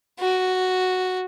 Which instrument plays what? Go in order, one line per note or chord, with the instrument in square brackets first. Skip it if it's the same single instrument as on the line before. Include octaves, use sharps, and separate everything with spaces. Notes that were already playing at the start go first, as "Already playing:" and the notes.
[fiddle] F#4